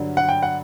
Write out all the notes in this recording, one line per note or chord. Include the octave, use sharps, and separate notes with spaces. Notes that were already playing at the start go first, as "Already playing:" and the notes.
Already playing: G2 D3 F#3
F#5
G5
F#5